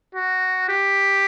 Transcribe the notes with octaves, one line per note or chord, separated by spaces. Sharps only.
F#4
G4